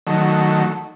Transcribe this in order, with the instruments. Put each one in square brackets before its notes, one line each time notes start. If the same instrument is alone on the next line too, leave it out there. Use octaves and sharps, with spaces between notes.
[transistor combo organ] D#3 F#3 A3